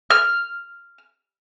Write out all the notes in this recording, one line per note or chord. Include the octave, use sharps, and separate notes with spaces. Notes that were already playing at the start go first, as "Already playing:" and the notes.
F6